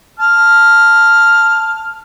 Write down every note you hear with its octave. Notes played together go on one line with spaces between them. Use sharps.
A5 F6